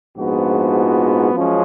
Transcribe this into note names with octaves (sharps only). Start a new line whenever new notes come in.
A#1 G#2 F3 B3 F#4
F#2 F3 G#3 C#4